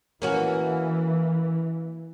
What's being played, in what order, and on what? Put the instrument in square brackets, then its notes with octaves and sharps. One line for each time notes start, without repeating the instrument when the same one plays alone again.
[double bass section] E3 [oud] A#3 C#4 F#4